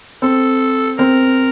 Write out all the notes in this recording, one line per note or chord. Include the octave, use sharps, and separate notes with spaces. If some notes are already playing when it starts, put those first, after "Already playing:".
C4 A4
C4 A#4